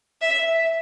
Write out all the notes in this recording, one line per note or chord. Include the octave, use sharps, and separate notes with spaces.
E5